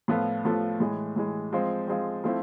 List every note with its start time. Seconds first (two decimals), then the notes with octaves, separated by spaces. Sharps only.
0.08 A2 F3 B3 F4 A4
0.45 A2 F3 B3 F4 A4
0.80 A2 E3 G#3
1.16 A2 E3 G#3
1.53 F3 G#3 C4
1.88 F3 G#3 C4
2.24 F3 A3 C4 E4